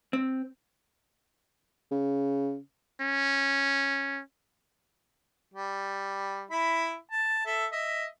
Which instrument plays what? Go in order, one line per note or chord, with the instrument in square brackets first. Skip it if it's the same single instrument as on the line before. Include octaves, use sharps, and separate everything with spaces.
[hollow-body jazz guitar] C4
[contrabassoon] C#3
[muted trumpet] C#4
[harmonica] G3
E4 B5
A5
A4 E5
D#5 E5